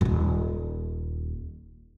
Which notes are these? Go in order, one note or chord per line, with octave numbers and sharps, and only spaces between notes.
D#1 G#1